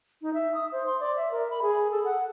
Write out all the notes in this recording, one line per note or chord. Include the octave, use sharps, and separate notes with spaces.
D#4
E5
D#6
C5
C6
D5
E5
A#4
B5
G#4
A4
F#5